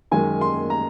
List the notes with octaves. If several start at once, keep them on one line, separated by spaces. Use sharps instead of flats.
F#2 D#3 G#3 G#5
C6
A#5